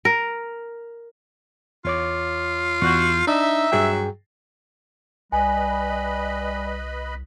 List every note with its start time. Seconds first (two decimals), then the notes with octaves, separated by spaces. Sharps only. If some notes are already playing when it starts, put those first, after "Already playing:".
0.05 A#4
1.85 E2 F4 C#5 D6
2.82 E2 F#4 G6
3.27 D4 D#4 E5
3.72 G2 F#3 G#4 G5
5.32 C2 G3 B4 D#5 G#5 B5